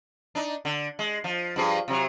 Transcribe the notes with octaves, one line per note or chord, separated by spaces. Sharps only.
D4 D#4
D3
G#3
F3
G2 F3 G#4
C3 F#3